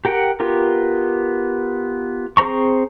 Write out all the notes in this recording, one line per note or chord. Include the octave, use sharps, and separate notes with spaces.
G4 A#4 F#5 G5
B3 F4 G4 A#4
C4 G#4 C5 A#5 C#6